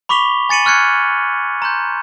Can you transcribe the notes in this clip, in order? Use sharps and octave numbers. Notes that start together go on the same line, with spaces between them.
B5 C#6 D6 B6 F7 G7
G#5 A6 C#7 D#7 F#7
C#6 F6 F#6 G#6 C#7
A#5 C6 G6